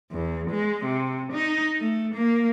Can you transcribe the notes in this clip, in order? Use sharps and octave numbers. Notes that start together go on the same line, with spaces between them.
E2
G#3
C3
D#4
A3
A#3